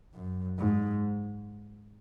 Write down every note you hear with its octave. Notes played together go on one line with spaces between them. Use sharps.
F#2
G#2